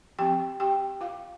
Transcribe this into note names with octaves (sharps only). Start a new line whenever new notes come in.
F3 C4 G4 G5
G4 G5
F4 F5